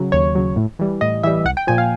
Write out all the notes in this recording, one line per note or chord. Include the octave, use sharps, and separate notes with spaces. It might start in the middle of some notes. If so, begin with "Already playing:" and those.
Already playing: C#3 F#3
D#2 C#5
C#3 F#3
A2
E3 G3
A2 D#5
E3 G3 E5
C2 F#5
G5
A#2 F3 G#5
F5